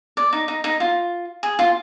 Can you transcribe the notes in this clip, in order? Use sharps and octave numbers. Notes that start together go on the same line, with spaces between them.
D5
D#4
D#4
D#4
F4
G#4
F4